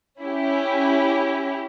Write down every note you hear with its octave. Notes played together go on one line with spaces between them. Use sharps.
C#4 E4 G4